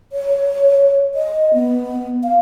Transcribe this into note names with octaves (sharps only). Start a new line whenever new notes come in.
C#5
D#5
B3
F5